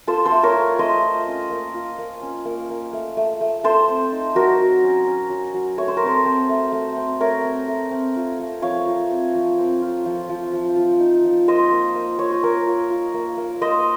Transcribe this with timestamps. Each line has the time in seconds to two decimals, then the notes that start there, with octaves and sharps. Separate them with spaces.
0.07 F4 A4 C5
0.25 A4 C5
0.31 A3
0.43 A#4 C#5
0.56 F4
0.79 A3 C5 D#5
1.03 A3
1.27 C#4
1.50 A#3
1.74 F4
1.99 A#3
2.22 C#4
2.45 A#3
2.70 A#3
2.93 A3
3.17 A3
3.41 A3
3.64 A3 A4 C5
3.88 C4
4.12 D#4
4.35 F#3 F#4 A#4
4.59 F#3
4.83 C#4
5.07 C#4
5.30 F#3
5.54 F#3
5.78 A3 C#5
5.88 C5
5.97 A#4
6.02 C4 A4 C5
6.25 C4
6.49 A3
6.72 A3
6.97 C4
7.20 A3 A#4 C#5
7.44 C4
7.68 A3
7.91 C4
8.16 F4
8.40 A3
8.62 F3 C#5 F5
8.86 F3
9.11 C4
9.35 F3
9.58 C4
9.82 F4
10.06 F3
10.29 F3
10.53 F3
10.76 F3
11.00 D#4
11.25 F3
11.48 A#3 C5 D#5
11.72 A#3
11.95 A#3
12.19 A#3 C#5
12.31 C5
12.42 A#3 A#4 C#5
12.67 F4
12.90 F4
13.14 A#3
13.37 A#3
13.61 A#3 C5 D#5